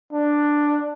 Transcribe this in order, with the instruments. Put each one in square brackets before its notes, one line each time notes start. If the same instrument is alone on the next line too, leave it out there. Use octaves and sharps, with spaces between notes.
[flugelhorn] D4